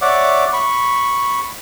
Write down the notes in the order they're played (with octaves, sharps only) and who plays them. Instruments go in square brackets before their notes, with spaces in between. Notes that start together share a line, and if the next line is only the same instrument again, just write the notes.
[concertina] C#5 D5 E5 F#5 D6
B5 C#6